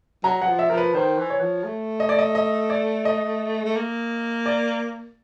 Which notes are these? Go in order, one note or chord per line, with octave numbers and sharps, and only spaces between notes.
F#3 A#5
F#3 F#5
F3
E5
F3 A#4
B4
D#3 C5
E3
C#5
F3
A3
D#5
D5
D#5
D#5
D5
D#5
A3
A#3
D5